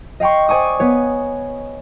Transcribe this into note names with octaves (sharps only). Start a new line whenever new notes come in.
D#5 F5 G5 C6 C#6
C5 D5 G#5 C#6 D#6
B3 C#5